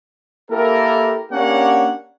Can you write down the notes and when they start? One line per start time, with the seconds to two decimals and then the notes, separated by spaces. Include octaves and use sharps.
0.51 A#3 E4 G4 A4 A#4
1.32 A#3 C#4 D4 G4 C#5 F#5